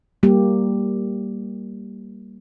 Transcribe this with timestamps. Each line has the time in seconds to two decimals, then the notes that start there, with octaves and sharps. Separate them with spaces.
0.23 G3 A#3 G4